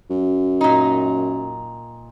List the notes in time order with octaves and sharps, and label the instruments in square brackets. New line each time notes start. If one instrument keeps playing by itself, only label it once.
[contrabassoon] F#2
[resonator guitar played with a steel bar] A#2 D#4